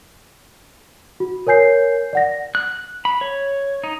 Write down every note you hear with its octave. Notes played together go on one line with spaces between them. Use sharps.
F#4
A#4 C#5 G#5 G6 C7
D5 F#5 A#6
F#6
B5
C#5
D#4